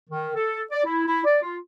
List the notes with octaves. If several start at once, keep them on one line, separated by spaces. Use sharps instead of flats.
D#3
A4
D5
E4
E4
D5
F4